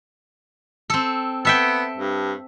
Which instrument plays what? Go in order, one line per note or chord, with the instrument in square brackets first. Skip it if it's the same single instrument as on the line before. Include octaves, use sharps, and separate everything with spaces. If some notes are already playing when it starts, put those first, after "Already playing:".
[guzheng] C4 A4
[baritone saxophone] B3 [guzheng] A4 E5 G5
[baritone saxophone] G2